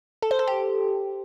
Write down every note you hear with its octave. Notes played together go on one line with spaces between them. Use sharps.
A4
C5
A4
G4